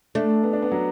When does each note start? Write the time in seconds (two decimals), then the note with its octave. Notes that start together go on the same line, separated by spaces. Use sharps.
0.15 A3 D4
0.43 B3
0.53 D4
0.62 B3
0.72 F#3